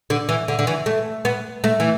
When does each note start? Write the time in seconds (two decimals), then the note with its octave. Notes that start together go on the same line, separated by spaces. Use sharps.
0.10 D3
0.29 E3
0.48 D3
0.59 D3
0.67 E3
0.86 A3
1.25 B3
1.64 A3
1.80 E3